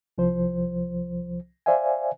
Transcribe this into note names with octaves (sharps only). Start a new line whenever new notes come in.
C2 F3 C5
C5 D5 E5 F5 G#5